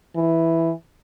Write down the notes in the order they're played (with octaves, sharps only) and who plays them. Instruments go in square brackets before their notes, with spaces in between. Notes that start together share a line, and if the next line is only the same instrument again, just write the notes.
[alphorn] E3